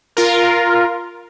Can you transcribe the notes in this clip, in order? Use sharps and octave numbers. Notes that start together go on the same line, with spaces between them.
F4 A#4